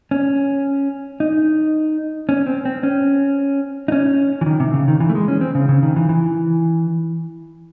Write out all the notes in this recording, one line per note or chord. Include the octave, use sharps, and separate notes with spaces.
C#4
D#4
C#4
C4
C4
C#4
D#4
C#4
E3
D#3
C3
C#3
D#3
E3
A3
G#3
C#4
C4
C#3
C#3
D#3
E3
E3